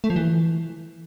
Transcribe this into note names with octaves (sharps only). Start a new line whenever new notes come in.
A3
F3
E3